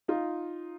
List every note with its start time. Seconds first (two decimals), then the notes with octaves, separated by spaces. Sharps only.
0.08 D#4 F4